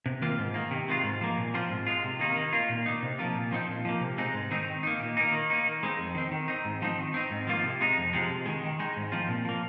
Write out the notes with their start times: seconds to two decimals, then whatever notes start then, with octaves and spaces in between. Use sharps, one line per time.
0.06 C3
0.22 D#3 A#3 F4
0.38 G#2
0.54 D#3 A#3
0.71 C3
0.88 D#3 G#3 F4
1.04 G#2
1.21 F3 A#3
1.37 A#2
1.54 F3 C4 F4
1.70 G#2
1.87 G#3 F4
2.03 C3
2.19 D#3 A#3 D#4
2.36 D#3
2.53 A#3 F4
2.69 A#2
2.86 A#3 D#4
3.03 C3
3.19 F3 A#3 F4
3.35 A#2
3.51 F3 C4 D#4
3.69 A#2
3.85 F3 A#3
4.01 C3
4.18 G#3 C4 D#4
4.34 G#2
4.51 D#3 C4 D#4
4.68 D#3
4.83 A#3 D#4
5.00 A#2
5.17 A#3 D#4
5.32 D#3
5.50 A#3 D#4
5.66 D#3
5.83 G#3 C4 D#4
5.99 F2
6.15 D#3 C4
6.31 D#3
6.48 C4 D#4
6.65 G#2
6.82 F3 C4 D#4
6.98 D#3
7.14 C4 D#4
7.31 G#2
7.47 F3 A#3 F4
7.64 C3
7.81 G#3 D#4
7.97 F2
8.13 C3 F3 G#3
8.30 C3
8.46 D#3 G#3
8.63 D#3
8.79 G#3 D#4
8.96 G#2
9.12 F3 C4 F4
9.28 A#2
9.45 F3 A#3